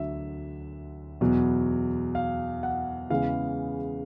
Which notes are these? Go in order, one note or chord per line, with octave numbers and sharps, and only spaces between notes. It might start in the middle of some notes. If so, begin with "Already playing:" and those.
Already playing: D2 D3 F#3 E5
E2 B2 F#3
F5
F#5
E2 C#3 E3 G#3 F5